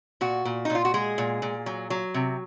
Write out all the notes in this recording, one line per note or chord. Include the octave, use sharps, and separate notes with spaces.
A#2 F#4
A#2
D#4
A#2
F4
F#4
G#3 G#4
A#2
A#2
F#3
F#3
C3